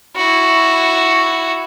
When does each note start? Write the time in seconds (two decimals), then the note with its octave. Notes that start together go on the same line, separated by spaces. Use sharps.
0.16 E4 F#4